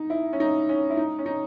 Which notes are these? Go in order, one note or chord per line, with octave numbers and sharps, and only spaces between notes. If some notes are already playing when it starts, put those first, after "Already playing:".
Already playing: D#4
E4
C#4
D#4
C#4
E4
D#4
C#4
D#4